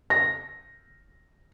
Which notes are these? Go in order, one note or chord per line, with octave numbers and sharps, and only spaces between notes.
A#6